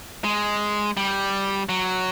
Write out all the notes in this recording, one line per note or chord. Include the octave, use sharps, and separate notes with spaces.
G#3
G3
F#3